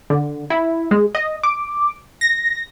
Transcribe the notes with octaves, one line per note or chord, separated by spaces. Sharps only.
D3
E4
G#3
D#5
D6
A#6